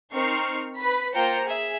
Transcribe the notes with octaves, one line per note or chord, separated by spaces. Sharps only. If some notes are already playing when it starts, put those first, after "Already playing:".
C4 D#4 A#4 C#6 F6 C7
B4 B5 B6
A#3 F4 C5 G5 A#5 C#7
G#4 E5